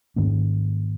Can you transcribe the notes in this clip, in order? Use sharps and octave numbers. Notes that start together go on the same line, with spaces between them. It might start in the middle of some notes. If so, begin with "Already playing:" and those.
G#2 D#3 A#3 C#4